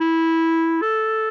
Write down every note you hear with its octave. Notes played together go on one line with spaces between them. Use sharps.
E4
A4